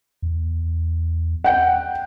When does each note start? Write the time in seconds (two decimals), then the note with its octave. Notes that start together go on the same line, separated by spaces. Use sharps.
0.22 E2
1.44 F#5 G5